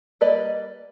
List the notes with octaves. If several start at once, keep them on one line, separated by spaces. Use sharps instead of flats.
G3 A#3 B4 D5 D#5